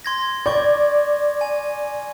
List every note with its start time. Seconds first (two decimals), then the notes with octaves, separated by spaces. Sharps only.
0.04 C6 G#6 A#6
0.46 D5 C#6 G6 G#6
1.41 G#5